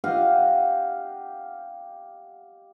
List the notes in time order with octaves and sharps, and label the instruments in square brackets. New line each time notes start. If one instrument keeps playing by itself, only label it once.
[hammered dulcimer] G4 D#5 F5 F#5